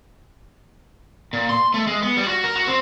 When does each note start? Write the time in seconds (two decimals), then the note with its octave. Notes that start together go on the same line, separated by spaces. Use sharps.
1.33 A#2
1.49 C6
1.74 A3
1.87 G#3
2.02 B3
2.17 G3
2.28 F#4
2.44 A#4
2.56 F#4
2.67 C4